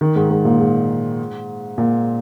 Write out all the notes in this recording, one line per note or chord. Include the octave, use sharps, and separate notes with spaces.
D#3
G#2
G#2
A#2
G#2
A#2